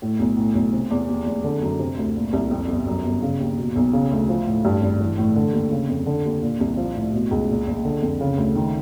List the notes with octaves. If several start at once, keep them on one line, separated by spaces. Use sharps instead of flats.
A2
B1
A2
B1
C3
E2
D#2
F1
D3
F#2
C3
D2
A#2
C2
F2
G1
F#2
G1
C#3
D#2
B2
B1
C#3
D2
F3
A2
G2
G#1
E3
A2
D3
D#2
C#3
F2
D3
D#2
A#2
C2
F3
A2
B2
C#2
A#2
A#1
D3
F2
C#3
D2
D#3